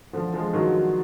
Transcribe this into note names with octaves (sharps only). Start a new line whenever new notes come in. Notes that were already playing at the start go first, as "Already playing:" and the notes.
D3 F3
F3 G#3
D#3 F#3